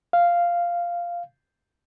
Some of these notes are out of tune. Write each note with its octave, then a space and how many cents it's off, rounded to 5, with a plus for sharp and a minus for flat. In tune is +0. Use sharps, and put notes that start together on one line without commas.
F5 -5